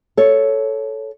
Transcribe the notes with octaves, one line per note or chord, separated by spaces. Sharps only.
A4 C#5